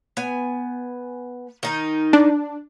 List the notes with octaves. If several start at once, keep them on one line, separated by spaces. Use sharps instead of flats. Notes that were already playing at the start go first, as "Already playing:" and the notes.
B3 G#5
D#3 D#4 A#4
D4